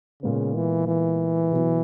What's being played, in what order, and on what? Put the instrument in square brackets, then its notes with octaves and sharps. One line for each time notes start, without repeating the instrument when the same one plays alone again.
[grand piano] A#2 G#3 B3 [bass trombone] C#3
[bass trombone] E3
E3
[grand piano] B2 F#3 B3